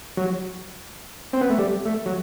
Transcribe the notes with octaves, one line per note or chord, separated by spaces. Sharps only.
F#3
C4
B3
A3
G3
A3
F#3